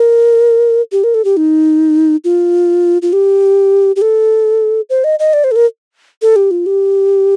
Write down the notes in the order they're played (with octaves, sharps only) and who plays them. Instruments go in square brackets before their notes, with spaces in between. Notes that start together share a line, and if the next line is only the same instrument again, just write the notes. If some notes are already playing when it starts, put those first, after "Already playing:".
Already playing: [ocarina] A#4
G4
A#4
A4
G4
D#4
F4
F4
G4
G4
A4
C5
D#5
D#5
D5
C5
A4
A#4
A4
G4
F4
G4